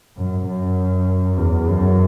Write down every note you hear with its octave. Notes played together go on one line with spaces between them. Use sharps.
F#2
F#2
E2
F#2